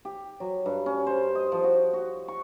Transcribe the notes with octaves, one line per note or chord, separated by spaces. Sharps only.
G4
F#3
G2
C#4
C5
D#5
F3
F#4
F#4
C#6